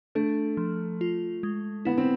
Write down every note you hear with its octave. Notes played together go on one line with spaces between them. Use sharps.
A3 D4
F3
F4
G#3
B3 E4
C4